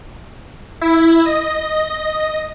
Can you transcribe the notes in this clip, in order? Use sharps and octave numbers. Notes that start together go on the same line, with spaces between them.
E4
D#5